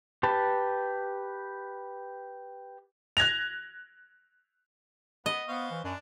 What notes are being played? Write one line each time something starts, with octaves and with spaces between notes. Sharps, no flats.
G4 B4 A5
F#6 G#6 A#6 F7
B3 D#5
B3 C5 F5 C#6
E3
F#2 D4